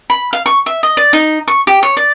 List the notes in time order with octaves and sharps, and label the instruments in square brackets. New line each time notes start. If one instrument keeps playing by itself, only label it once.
[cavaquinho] B5
F5
C#6
E5
D#5
D5
D#4
C#6
G4
C#5
D5